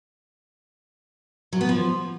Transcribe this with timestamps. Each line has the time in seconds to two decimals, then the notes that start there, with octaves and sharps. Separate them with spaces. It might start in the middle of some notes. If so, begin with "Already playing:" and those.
1.53 F#3
1.61 B3
1.69 F3